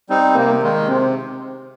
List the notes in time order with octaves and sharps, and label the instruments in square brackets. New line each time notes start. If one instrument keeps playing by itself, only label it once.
[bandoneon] G3 C4 D#4
[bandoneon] C3 [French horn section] A#3
[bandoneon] D#3 G#3
[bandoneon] C3 [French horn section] C4